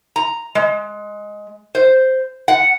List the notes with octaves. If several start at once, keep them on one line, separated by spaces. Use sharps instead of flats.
A#5
G#3
C5
F#5